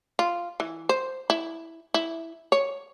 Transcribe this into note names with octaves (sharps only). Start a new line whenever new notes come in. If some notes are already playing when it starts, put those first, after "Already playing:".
F4
E3
C5
E4
E4
C#5